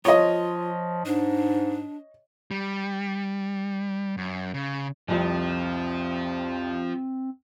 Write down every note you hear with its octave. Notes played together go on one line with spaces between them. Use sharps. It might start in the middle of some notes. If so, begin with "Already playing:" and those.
F3 F4 C#5 D#5
G#2 D4
G3
F#2
C#3
C2 F2 F3 C4